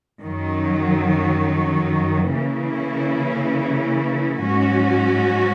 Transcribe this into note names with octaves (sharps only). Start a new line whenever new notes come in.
F#2 D#3 F#3
C#3 E3 A#3 C#4 E4
G#2 F#3 C#4 F#4